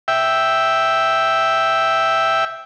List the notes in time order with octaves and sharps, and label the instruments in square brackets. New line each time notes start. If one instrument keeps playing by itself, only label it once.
[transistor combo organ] E5 G5